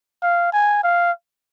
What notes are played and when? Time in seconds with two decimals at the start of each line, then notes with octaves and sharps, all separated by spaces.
0.22 F5
0.53 G#5
0.84 F5